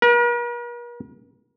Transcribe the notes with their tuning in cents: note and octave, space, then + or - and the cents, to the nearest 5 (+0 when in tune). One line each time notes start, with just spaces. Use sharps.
A#4 +45